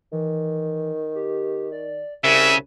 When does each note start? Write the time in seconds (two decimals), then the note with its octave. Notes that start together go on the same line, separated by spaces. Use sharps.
0.13 D#3 E3
1.15 G4
1.72 D5
2.24 C2 C#3 E5 F#6